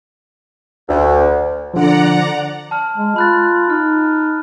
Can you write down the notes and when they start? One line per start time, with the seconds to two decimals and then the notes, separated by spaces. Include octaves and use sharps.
0.88 D2
1.74 D3 F3 D5 F#5 A#5
2.71 A5 F6
2.97 G#3
3.16 F4 B5 F#6 A6
3.70 D#4 F6